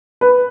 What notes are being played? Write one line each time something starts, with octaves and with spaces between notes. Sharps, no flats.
B4